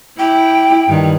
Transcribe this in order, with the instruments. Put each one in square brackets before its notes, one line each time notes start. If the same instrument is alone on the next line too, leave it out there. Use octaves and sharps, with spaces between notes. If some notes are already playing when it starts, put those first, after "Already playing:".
[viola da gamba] E4 [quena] G5
[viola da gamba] G2 D#3